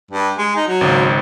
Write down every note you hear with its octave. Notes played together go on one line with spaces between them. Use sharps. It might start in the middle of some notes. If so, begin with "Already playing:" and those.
G2
G#3
D#4
F#3
G#1 C#2